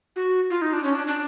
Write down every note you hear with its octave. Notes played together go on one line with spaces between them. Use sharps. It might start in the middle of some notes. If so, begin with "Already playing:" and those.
F#4
F4
D#4
D4
C#4
D4
D4